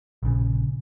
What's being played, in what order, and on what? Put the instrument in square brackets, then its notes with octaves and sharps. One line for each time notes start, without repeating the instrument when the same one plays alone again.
[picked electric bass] A#1 C#3